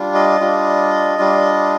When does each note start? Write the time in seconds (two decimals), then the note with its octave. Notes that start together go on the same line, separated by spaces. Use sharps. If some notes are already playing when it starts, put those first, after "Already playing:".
Already playing: G3 D4 F4
0.15 D#5
0.40 G3 D4 F4
1.19 G3 D4 F4